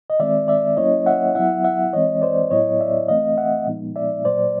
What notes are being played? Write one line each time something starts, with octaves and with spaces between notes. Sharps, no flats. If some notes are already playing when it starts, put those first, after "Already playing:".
D#5
D#3 G#3 C4 D5 E5
D5 E5
F#3 A#3 C#4 E4 C#5 D#5
E5 F#5
F#3 B3 E4 E5 F#5
E5 F#5
E3 G#3 C4 C#5 D#5
C5 D5
A2 F#3 B3 E4 C#5 D#5
D5 E5
E3 A3 C4 D#5 F5
E5 F#5
A#2 F3 G#3 B3 D#4
D5 E5
A#2 F#3 A#3 C5 D5